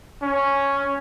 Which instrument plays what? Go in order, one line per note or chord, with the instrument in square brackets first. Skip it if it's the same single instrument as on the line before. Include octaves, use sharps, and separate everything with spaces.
[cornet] C#4